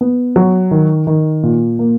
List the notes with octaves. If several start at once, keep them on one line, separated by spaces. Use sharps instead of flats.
B3
F#3
D#3
D#3
A#2
A#3